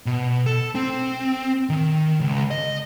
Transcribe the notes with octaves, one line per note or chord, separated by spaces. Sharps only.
B2
A4
C4
D#3
C#2
D#5